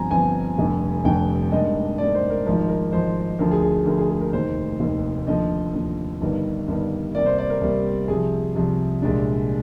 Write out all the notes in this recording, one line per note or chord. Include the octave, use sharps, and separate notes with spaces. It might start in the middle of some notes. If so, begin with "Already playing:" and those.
Already playing: G1 G2 F3 C4 G#5 A#5
G1 G2 F3 C4 G#5
F1 F2 D3 G3
F1 F2 D3 G3 G5
G#2 G3 A#3 D4 D#5
G#2 G3 A#3 D4 D5
C5
A#4
G#1 G#2 F3 A#4
A#4
G#1 G#2 F3 C5
D2 D3 F3 A#4
G#4
G#4
D2 D3 F3 A#4
G#4
G#4
A#4
F1 D#2 D#3 C5
F1 D#2 D#3
D#2 D3 F3 D#5
D#2 D3 F3
G1 G2 D#3 G3
G1 G2 D#3 G3
C2 C3 G3 A#3 D5
C5
D5
A#4
C2 C3 G3 A#3
C2 C3 F3 G#4
C2 C3 F3
C2 A#2 G#3 D4